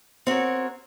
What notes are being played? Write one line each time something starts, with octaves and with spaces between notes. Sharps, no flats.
C4 F#4 A#4 C#5